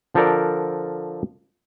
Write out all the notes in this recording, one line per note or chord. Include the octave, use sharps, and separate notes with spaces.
D3 F3 D4 A4 A#4 D5